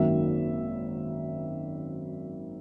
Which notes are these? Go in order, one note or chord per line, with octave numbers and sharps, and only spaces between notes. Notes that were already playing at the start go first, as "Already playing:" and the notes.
Already playing: G#1 F#2 D#3 F#3 A#3 E5